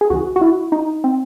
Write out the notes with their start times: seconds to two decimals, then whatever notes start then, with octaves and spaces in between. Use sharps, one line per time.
0.01 G#4
0.10 C#2 C#3 E3 F#4
0.36 F#4
0.41 E4
0.72 D#4
1.04 C4